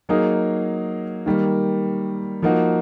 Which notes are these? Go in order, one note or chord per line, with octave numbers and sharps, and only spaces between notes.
F#3 A#3 D#4 G#4
D#3 G3 A#3
F3 A#3 D#4 F#4